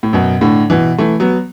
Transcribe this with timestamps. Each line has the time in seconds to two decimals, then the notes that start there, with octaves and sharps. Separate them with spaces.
0.03 A2
0.13 F#2 B2
0.41 A2 D3
0.70 B2 E3
0.98 E3 A3
1.20 F#3 B3